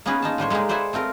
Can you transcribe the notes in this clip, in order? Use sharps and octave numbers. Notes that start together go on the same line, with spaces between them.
A#3 B3 C#4 D#4 G#4 B4
A#3 D#4 F4 A5
A2 G3 C5 C#5
G#3 A#3 D#4 G4 G#4
B4 C5 D5 E5 F#5 G#5
A3 C4 F4 A#4